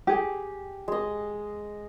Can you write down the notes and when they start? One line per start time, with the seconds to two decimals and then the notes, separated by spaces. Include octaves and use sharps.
0.07 G4 G#4
0.88 G#3 D#5